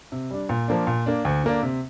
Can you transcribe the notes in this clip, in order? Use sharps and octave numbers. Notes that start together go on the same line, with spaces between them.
C3
G3 D4
A#2
F3 A#3 D4
A#2
A#3 D4
D2
D3 A#3 D4
C3